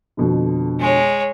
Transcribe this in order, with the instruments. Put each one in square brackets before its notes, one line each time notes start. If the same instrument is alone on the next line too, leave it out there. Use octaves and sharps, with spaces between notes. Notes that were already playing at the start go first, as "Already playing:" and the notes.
[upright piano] F2 B2 D3
[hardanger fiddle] G#3 C#5